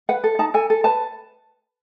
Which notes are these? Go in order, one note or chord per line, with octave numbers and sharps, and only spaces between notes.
B4 F#5
A4
D#4 A5
A4 G#5
A4
B4 A5